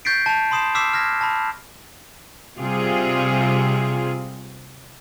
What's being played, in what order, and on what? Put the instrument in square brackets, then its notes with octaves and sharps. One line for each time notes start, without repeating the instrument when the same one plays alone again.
[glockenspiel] C#6 G6 A6 B6 C7 D7
A5 F7
B5 C6 D#6 C7 E7
D6 E6 F6 B6 C7 E7
F6 G#6 A#6 B6
A5 B5
[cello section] C3 G3 F4 G#4